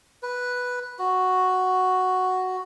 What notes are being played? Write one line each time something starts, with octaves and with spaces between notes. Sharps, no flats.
B4
F#4